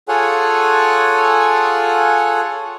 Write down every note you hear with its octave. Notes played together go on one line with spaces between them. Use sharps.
F4 G#4 A4 C#5 F#5 G#5